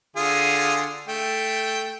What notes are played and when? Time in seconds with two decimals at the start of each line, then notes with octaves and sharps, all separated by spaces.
0.16 D3 F4 G#4
1.08 A3 G5